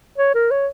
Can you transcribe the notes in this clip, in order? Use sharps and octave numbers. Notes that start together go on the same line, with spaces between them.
C#5
A#4
C#5